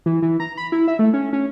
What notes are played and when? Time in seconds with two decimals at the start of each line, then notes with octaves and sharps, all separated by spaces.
0.06 E3
0.22 E3
0.40 A#5
0.57 B5
0.72 E4
0.88 E5
0.99 A3
1.14 C#4
1.33 C#4